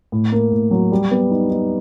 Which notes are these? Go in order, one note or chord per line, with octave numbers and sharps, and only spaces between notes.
A2
A#3
A2
F#3
G3
B3
D#4
D#4